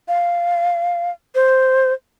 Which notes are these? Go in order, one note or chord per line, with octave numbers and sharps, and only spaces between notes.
F5
C5